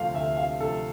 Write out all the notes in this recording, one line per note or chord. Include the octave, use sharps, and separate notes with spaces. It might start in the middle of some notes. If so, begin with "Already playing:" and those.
Already playing: D2 C3 F3 A3 F5
D2 E5
F5
C3 F3 A3 A4